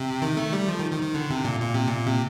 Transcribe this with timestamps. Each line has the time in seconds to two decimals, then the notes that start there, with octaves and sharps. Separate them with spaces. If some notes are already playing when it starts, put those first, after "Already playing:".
Already playing: C3
0.22 D#3
0.37 A3
0.53 G3
0.68 F3
0.79 D#3
0.91 D#3
1.03 D#3
1.14 D3
1.30 C3
1.45 A#2
1.60 A#2
1.74 C3
1.88 A#2
2.06 C3